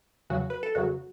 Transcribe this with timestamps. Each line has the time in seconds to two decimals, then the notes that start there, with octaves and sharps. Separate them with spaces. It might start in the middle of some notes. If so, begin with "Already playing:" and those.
0.30 E2 C#3 F#3 F#4
0.50 B4
0.63 A4
0.75 E2 C#3 F#3 F#4